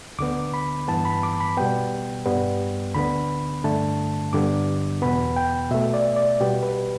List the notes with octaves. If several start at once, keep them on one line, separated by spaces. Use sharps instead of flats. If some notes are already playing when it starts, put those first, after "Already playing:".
D2 D3 B3 D6
B5
G2 E3 B3 A5
B5
D6
B5
B2 G3 B3 G5
G2 G3 B3
D2 D3 B3 B5
G2 D3 A3 A5
G2 D3 G3 B3 D6
E2 B2 B3 B5
G5
B2 A3 E5
D5
D5
B2 G3 B3 G4
B4